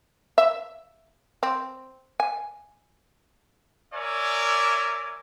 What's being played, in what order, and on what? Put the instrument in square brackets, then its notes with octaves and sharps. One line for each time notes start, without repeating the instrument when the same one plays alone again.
[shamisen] E5
C4
G#5
[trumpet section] A#4 C#5 D5 E5 G#5